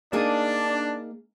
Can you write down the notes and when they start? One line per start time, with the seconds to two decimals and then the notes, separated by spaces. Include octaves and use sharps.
0.13 A#3 D4 D#4 G#4